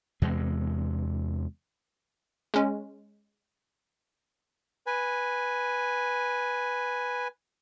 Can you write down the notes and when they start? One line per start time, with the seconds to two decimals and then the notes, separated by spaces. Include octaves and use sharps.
0.22 E2 C3 G#3
2.54 G#3 C#4
4.87 B4 G#5